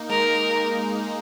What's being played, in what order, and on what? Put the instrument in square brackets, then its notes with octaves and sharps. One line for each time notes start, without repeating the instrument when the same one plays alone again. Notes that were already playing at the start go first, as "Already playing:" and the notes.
Already playing: [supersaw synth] A#3 D#4
[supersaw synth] G#3 [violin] A#4